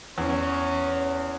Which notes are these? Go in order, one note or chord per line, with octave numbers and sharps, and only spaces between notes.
E2 C#4